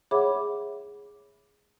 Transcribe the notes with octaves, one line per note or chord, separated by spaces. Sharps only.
G#4 C#5 E5 F#5 B5 D6